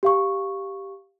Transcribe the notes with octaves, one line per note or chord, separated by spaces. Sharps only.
G4 F5 C#6